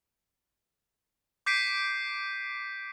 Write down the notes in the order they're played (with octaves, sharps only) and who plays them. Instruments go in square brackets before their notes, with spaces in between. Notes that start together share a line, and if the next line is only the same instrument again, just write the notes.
[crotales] D6 G6 B6 C7 D7 D#7